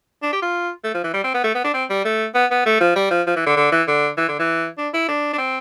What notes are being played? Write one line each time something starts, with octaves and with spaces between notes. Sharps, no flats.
D4
G4
F4
A3
F3
E3
G3
C4
B3
A3
B3
D4
C4
G3
A3
B3
B3
A3
F3
G3
F3
F3
E3
D3
D3
E3
D3
E3
D3
E3
D4
E4
D4
D4
C4